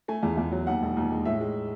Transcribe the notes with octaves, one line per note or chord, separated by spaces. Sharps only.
A3 G#5
E2
E2
F#3
D#2 F#5
E1
D#2
G#3
A2 E5
G#3